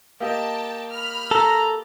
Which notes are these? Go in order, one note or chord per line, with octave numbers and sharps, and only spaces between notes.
A#3 G4 D#5 G5 A5
B5 F6
A4 A#5